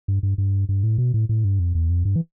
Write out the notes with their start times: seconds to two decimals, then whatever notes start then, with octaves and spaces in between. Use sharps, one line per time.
0.08 G2
0.23 G2
0.38 G2
0.69 G2
0.83 A2
0.98 B2
1.14 A2
1.29 A2
1.44 G2
1.59 F2
1.75 E2
1.90 F2
2.05 G2
2.16 E3